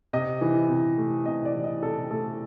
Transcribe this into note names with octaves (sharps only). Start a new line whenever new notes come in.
C3 D#5
E3
C3
A3
C3 D#5
D5
E3
D#5
C3 A4
A3 A4